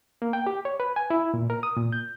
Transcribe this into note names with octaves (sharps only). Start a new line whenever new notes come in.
A#3
G5
G4
C#5
B4
G#5
E4
A#2
A#4
D#6
A#2
G6